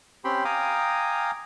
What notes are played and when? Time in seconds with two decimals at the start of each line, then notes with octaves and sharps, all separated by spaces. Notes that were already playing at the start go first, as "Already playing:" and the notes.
0.25 C4 C#4 G4 G5 B5 C6
0.45 F5 G5 G#5 A#5 D6 D#6